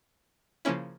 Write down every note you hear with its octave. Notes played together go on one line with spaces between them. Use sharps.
C#3 F3 A#3 C#4 E4